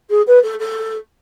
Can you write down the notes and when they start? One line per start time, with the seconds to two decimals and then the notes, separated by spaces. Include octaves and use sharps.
0.09 G#4
0.27 B4
0.42 A4
0.59 A4